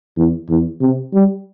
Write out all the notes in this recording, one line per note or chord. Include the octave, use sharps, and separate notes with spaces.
E2
E2
C3
G3